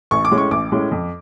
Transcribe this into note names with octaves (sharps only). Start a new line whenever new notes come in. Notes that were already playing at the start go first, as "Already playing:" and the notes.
A1 C#6
D6
A2 G#3 C#4
C#6
A1 D6
A2 G#3 C#4
F2